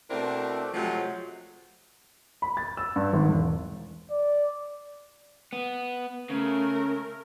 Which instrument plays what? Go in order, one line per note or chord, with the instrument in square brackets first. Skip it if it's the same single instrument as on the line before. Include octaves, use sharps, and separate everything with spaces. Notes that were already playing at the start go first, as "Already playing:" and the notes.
[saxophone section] B2 A3 C4 D4 E4 A#4
C3 F3 F#3 G#3 A3 G#4
[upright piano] B5
A6
E6
G2
G#1
E1
[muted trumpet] D5
[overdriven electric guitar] B3
[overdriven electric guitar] C#3 [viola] A3 A#4